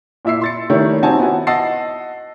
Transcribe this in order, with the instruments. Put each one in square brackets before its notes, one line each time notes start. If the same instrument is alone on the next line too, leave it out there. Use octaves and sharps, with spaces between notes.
[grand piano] A#2 E4 E5 E6 C7
C6 A6 C#7
D#3 G3 A3 E4 C#5
C4 D#4 F#4 C#5 G#5 A5
B3 E4 F#4
D#5 F#5 A5 E6 A6 C7